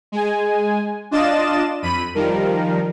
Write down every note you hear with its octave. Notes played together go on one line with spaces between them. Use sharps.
G#3 G#5
D4 F4 D5 D#5 A6 E7
F2 B5 D#7
D#3 F3 G3 A#4